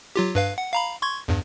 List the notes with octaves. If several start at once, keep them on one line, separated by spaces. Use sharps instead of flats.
F#3 F4 G4
G2 B4 F5
F#5
F5 A#5 B5
C6 C#6 G#6
E2 G2